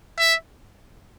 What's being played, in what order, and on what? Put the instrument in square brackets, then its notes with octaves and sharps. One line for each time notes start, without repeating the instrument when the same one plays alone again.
[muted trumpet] E5